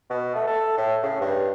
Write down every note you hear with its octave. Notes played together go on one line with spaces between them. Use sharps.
B2
A3
A4
A2
C#3
G2